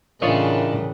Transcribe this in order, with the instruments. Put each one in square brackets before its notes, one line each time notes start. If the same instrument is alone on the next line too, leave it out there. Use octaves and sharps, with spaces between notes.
[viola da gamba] A2 C#3 E3 [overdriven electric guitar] D4 [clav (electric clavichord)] F4 C#5 D#5 [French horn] A#4